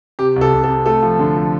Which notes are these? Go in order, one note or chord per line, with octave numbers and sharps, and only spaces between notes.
C3 G4
C2
A4
C2
A4
C3
A3 A4
F3
D3
F3